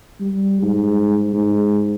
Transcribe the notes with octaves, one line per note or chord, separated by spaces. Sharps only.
G3
G#2
G#2